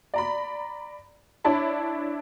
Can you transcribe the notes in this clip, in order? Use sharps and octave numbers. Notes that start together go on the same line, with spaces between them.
D5 A#5 B5
D4 E4 C#5 A5 B5